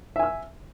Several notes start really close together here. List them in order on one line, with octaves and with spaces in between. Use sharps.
E5 G#5 E6